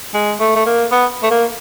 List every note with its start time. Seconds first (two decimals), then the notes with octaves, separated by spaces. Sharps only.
0.14 G#3
0.40 A3
0.56 A3
0.66 A#3
0.92 B3
1.23 A3
1.31 A#3